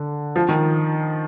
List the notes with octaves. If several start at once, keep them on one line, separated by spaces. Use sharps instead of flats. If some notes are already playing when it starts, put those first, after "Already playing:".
Already playing: D3
F3
D#3